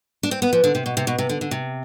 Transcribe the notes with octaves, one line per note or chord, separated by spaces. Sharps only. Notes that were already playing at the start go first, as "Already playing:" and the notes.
D4
C4
B3
F3
D3
C3
B2
C3
B2
C3
D3
D3
C3